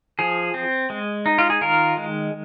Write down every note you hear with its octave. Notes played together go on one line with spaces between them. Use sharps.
F3 G#4
C4
G#3
D#4
F4
G#4
D#3 F4 A#4
G#3